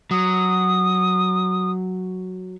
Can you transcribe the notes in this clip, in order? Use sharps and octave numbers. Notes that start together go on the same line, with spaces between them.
F#3 D#6